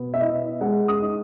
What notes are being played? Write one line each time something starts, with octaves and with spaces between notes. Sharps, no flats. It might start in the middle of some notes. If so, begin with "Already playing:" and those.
Already playing: B2 B3
E5
E4 D#5
G#3 F#5
D#6
D#4